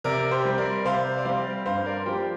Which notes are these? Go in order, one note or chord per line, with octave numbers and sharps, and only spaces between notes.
C3 A#4 D5
G4 C5
G3 C4
A#4 D5
C3 C5 F5
D5
G3 C4 C5 F5
G2 C5 F5
A#4 D5
F3 A#3 G4 C5